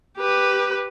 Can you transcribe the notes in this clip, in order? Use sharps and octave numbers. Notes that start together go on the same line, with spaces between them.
G4 B4